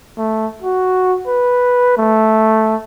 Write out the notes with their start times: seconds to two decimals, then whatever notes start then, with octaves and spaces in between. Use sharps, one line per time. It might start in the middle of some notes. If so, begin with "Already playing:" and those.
0.18 A3
0.62 F#4
1.27 B4
1.97 A3